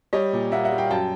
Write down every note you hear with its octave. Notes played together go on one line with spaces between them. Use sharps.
G3 C#5 D#5
A#2
A#3 E5 F#5
E5 F#5
G3
F5 G5
F#2 G5 A5